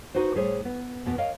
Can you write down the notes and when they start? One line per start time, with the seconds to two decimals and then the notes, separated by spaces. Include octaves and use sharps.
0.15 D#4 F#4 B4 C5
0.35 A2 G3 G#4 C5 C#5
0.65 B3
1.06 E2 B2 B3
1.18 A#4 C#5 D#5 F5